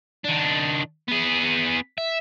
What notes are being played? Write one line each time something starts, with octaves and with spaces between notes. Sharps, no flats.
D#3 D4
B3 G#4
E5